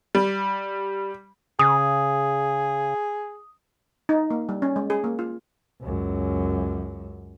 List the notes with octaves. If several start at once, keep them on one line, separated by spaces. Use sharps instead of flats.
G3
C#3 G#4 D#6
D#4
A#3
G3
C#4
G#3
G#4
A#3
F4
C#2 F#2